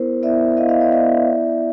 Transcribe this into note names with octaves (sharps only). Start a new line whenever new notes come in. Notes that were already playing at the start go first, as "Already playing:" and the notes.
Already playing: B3 E4 A#4 C5
B3 E4 D5 E5
B3 E4 D#5 F5
D#5 F5
D5 E5
B3 E4 D5 E5
B3 E4